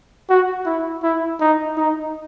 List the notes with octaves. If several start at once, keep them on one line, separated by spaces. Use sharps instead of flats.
F#4
E4
E4
D#4
D#4